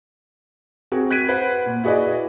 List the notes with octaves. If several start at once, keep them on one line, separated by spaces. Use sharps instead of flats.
C4 F#4 G#4 A#4
F#6 G#6 B6 D7 D#7
B4 C5 F#5
A#2
E4 F#4 G#4 B4 D5 D#5